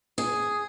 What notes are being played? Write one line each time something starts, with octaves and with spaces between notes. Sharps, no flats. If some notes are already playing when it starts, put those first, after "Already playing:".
G#4